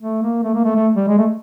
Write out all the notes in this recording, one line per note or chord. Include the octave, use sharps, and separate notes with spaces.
A3
A#3
A3
A#3
A3
A3
G3
G#3
A3